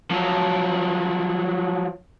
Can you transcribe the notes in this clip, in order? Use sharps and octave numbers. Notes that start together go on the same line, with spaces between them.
F3 F#3